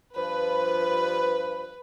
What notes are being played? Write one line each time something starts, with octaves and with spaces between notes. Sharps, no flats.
G2 F3 B4